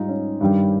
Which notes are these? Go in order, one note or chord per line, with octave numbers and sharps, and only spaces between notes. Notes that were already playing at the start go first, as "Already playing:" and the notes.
Already playing: G#2 G3 D#4 F4
C#4
G2 D#3 G3